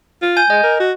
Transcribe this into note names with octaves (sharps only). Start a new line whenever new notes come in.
F4
G#5 G6
G#3 D#5
A#4
F#4